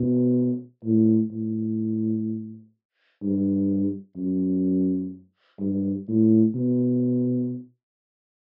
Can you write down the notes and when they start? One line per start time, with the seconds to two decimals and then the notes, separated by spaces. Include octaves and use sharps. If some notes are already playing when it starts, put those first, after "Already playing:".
Already playing: B2
0.84 A2
1.31 A2
3.22 G2
4.17 F#2
5.60 G2
6.08 A2
6.55 B2